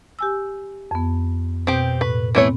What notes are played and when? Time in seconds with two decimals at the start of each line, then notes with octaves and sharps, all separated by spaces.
0.19 G4 G#5 E6
0.91 F2 B3
1.67 B2 C4 G4
2.01 A2 B4
2.35 E3 A3 B3 C4 C#5